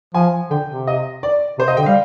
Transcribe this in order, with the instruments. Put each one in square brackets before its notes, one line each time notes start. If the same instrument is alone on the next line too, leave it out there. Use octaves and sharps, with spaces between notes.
[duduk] F3 [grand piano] G#5
[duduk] D3 [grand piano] G5
[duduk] C3
[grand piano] D#5
D5
[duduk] C3 [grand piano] C5
[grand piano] D#5
[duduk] D3 [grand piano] G5
[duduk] G3 [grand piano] F5